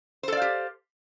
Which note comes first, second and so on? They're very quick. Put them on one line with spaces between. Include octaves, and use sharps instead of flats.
C5 A4 D5 F5 G4